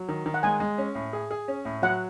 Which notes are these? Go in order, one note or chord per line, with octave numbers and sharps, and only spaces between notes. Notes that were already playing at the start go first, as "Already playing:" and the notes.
Already playing: F#3
D#3
D#3
F#5
G#3 G#5
G#3
C#4
A2
G#4
G#4
C#4
A2
F#3 F#5